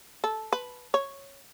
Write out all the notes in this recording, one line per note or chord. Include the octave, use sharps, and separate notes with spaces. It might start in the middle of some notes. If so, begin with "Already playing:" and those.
A4
B4
C#5